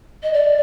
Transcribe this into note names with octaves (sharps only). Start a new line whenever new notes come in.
D#5
D5